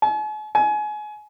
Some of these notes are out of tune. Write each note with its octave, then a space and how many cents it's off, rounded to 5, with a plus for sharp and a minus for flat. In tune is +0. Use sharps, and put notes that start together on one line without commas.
G#5 +45
G#5 +25